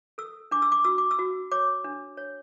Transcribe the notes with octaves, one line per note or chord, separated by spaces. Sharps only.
A4 E6
D4 D6
E6
D6
F#4 E6
D6
E6
F#4
C#5 D6
D4
C#5